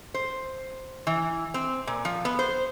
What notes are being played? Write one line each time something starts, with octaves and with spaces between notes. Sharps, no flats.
C5
E3
C4
A#2
F3
B3
C5